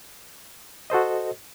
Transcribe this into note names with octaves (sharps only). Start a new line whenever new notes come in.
F#4 A4 C5 D#5